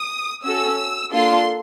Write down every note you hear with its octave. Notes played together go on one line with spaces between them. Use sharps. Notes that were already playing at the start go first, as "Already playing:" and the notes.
Already playing: D#6
C#4 F#4 A4 E6
A#3 D4 F4 A4 C6